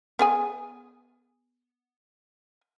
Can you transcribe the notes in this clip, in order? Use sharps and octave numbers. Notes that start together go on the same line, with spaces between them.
B3 G#4 G#5